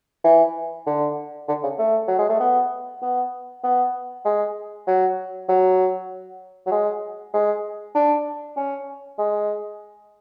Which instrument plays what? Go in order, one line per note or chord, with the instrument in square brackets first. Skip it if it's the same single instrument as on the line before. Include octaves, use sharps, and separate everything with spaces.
[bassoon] E3
D3
D3
C#3
A3
F#3
G#3
A3
B3
B3
B3
G#3
F#3
F#3
F#3
G#3
G#3
D4
C#4
G#3